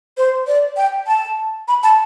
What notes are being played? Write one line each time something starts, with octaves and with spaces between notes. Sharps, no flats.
C5
D5
G5
A5
B5
A5